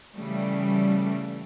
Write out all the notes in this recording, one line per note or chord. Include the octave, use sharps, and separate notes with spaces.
C#3 E3 G3 A3